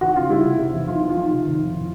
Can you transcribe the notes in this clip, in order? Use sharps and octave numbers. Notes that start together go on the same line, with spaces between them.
E3 F#4
C#3 F4
G3 E4
C3
C3
E2
B1 F4
B2
F4
B1
C3
D#3
F2
A2